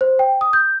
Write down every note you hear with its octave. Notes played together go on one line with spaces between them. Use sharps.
C5
G5
D#6
G6